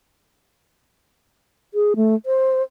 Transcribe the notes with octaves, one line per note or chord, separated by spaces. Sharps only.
G#4
A3
C5